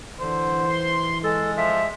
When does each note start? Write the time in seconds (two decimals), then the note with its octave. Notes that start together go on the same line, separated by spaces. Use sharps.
0.20 D3 E3 C5
0.70 C6
1.24 G#3 A4
1.58 F3 E5